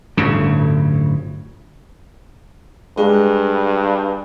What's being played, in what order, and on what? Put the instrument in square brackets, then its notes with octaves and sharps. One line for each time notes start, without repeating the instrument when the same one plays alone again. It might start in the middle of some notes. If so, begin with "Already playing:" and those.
[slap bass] D1 G1 D2 C#3
[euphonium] G2 [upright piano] G#3